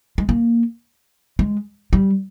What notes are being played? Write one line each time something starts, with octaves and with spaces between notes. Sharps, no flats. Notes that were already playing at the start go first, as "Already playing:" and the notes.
G#3
A#3
G#3
G3